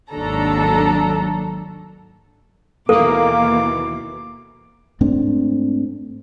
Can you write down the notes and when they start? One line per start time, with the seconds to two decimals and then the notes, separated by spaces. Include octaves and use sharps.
0.12 G#1 D#2 F#3 D4 A4 A#5
2.89 D#2 B2 E3 A#3 A4 D6
5.01 G#2 A3 C4 D4